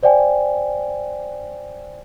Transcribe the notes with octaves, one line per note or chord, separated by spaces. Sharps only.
C5 D5 F5 G5 G#5